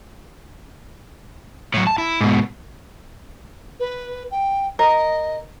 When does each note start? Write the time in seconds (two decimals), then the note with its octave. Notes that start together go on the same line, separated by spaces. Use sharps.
1.74 A2 F#3
1.87 A5
1.98 E4
2.21 G#2 B2
3.80 B4
4.31 G5
4.79 A#4 D#5